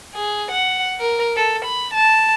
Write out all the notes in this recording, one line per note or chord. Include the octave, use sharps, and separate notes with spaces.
G#4
F#5
A#4
A4
B5
A5